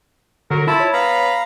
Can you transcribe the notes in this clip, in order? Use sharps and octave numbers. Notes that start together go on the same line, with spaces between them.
D3 F#3 A#4
E4 F4 A5 B5
C#5
B3 F5 A#5 B5